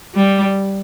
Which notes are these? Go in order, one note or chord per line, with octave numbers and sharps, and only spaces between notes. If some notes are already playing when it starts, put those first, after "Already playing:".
G3